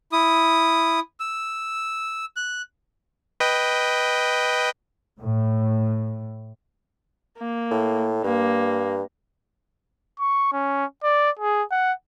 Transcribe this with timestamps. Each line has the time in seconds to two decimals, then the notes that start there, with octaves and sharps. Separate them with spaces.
0.12 E4 D#6
1.20 E6
2.36 F#6
3.40 B4 D#5 G5
5.21 A2
7.38 A#3
7.71 A2
8.24 G2 A#3
10.19 C#6
10.53 C#4
11.03 D5
11.39 G#4
11.71 F#5